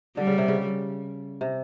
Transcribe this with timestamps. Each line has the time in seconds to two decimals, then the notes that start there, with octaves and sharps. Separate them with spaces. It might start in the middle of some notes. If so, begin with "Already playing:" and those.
0.17 D3 G3
0.27 C#3
0.38 C3
0.48 C#3
1.41 C3